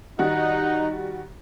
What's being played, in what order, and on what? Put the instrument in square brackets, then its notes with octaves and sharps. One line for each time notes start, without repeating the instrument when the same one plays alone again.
[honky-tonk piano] D#3 G3 F#4 [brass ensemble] D#4 [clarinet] F#5